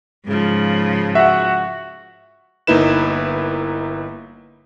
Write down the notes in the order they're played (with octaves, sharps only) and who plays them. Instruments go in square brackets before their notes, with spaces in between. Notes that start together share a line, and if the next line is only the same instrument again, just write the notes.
[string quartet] G#2 C#3 F3
[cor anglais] F#4 [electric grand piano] E5 F#5
[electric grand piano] G1 A#3 D#4 E4 B4 E7